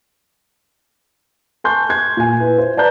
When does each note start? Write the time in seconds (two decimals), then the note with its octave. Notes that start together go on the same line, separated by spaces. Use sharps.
1.64 G#5 A5 C6 C#6 G6
1.89 F#6 G#6
2.17 A#2 G#5
2.40 E4 B4
2.58 C5
2.77 B4 D5 A5 A#5 G6